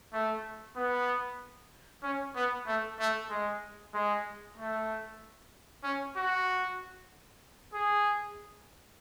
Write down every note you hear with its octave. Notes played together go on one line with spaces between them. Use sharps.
A3
B3
C#4
B3
A3
A3
G#3
G#3
A3
C#4
F#4
G#4